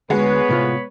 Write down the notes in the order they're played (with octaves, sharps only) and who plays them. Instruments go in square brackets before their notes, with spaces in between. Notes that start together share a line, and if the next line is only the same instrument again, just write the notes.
[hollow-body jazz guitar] D2 F#5 [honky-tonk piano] G#3 [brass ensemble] B3 B4 C#5
[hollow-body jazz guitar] A2 C3 F4